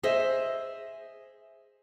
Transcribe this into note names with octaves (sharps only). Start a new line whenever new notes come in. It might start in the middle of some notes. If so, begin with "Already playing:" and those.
G#4 C5 D#5 E5